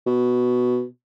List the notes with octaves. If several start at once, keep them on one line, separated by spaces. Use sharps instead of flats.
B2